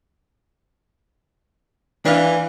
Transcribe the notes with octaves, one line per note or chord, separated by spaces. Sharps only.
E3 D4 F5